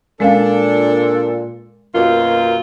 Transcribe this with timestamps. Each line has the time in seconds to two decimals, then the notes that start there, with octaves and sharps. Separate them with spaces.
0.20 A#2 G#3 C#4 D4 A4 F5
1.94 F#2 B2 A#3 F4